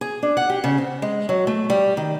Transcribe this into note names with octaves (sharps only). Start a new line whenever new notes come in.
G#4
D4
F#5
G4
C#3
C4
G#3
F#3
A3
G3
D#3